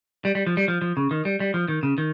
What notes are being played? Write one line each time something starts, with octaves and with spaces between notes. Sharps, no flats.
G3
G3
F3
G3
F3
F3
C#3
D#3
G3
G3
F3
D#3
C#3
D#3